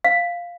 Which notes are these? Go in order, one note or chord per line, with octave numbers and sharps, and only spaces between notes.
F5